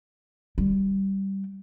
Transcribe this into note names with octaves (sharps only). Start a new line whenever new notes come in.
G3